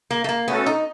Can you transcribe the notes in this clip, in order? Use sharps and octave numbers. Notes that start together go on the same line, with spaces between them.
A#3
A3
A#3
A3 B3 C#4 F#4 A4
D#4